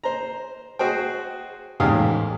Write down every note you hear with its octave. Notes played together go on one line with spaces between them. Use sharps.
C5 A#5
F#4 G#4 C5 G5
A1 E2 G#2 G4 F5 D#6